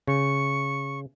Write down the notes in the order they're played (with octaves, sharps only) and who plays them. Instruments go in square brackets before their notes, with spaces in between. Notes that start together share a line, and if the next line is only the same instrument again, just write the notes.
[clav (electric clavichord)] C#3 [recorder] C#6